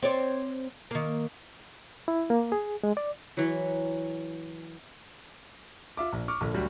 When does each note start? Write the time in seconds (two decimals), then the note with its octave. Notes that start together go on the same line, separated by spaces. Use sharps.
0.02 C4 C#5 D5
0.91 D#3 A#3
2.08 E4
2.30 A#3
2.52 G#4
2.83 G#3
2.97 D5
3.37 E3 F#3
5.97 F4 E5 D6
6.13 A#1
6.28 C#6 D6 F6
6.41 A#1 D3
6.54 D2 F#3 G3